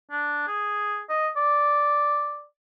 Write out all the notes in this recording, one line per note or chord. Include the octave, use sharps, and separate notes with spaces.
D4
G#4
D#5
D5